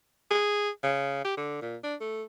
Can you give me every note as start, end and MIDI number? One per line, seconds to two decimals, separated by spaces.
0.31 0.69 68
0.83 1.22 49
1.24 1.37 67
1.37 1.59 50
1.61 1.76 46
1.83 1.95 62
2.00 2.23 57